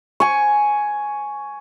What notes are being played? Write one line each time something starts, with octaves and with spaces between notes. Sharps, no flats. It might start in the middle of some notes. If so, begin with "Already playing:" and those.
G#5 C#6